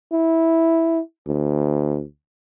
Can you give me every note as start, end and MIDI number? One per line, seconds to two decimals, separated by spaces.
0.12 1.00 64
1.27 2.03 38